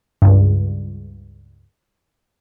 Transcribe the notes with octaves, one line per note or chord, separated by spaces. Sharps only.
C#2 G2